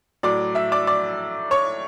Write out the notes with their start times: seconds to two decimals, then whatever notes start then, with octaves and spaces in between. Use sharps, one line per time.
0.23 A2 F#3 D5 D6
0.55 E5 E6
0.72 D5 D6
0.87 D5 D6
1.51 C#5 C#6